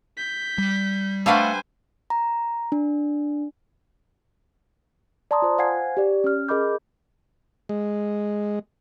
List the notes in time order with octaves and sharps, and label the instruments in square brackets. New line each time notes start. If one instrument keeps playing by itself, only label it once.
[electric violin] G6 B6
[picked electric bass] G3
[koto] G3 D4 B4 [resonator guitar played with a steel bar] A3 F5 F#5 [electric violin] C5 G#5
[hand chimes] A#5
D4
D5 A5 A#5 C6 D#6
F4 C5
C5 F5 F#5 G#5 G#6 C7
G4 D5
C#4 F6
G#4 A#4 D#5 B5 D6 G6
[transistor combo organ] G#3